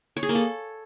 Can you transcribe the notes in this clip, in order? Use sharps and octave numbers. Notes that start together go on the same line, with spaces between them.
C#5
G#4
A#3
A4